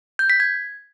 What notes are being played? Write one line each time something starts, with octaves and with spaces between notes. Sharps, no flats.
G6
B6
G#6